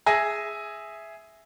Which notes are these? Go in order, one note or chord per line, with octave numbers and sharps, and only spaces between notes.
G#4 E5 G#5 A#6